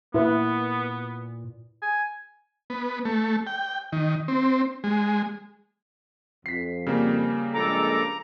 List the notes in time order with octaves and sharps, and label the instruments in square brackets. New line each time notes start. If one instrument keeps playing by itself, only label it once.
[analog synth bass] A#2 [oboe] B3 [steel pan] E4 B4
[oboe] G#5
[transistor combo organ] B3
A3
G5
D#3
C4
G#3
[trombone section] F2 [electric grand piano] B6 C7
[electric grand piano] C#3 G3 A#3
[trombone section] A#1 G#3 [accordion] A4 D6 [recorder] A#5